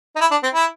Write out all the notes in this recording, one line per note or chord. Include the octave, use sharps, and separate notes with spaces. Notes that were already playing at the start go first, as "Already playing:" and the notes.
D#4
E4
D4
C4
E4